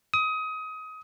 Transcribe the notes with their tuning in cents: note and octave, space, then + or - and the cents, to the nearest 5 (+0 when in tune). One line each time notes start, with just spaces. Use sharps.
D#6 +25